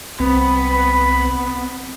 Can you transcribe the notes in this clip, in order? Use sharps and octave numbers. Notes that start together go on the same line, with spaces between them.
C2 B3 C4 B5